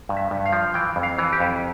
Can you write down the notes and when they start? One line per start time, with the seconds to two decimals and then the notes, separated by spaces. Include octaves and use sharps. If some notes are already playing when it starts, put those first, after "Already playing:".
0.09 G2
0.17 E5
0.31 G2
0.46 F5
0.53 F3
0.74 E3 G5
0.96 F2
1.03 F5
1.19 E3
1.33 G4
1.40 F2